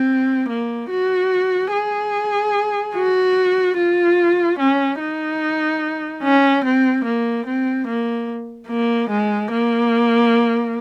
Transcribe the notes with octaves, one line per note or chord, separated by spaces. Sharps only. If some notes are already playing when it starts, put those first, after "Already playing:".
Already playing: C4
A#3
F#4
G#4
F#4
F4
C#4
D#4
C#4
C4
A#3
C4
A#3
A#3
G#3
A#3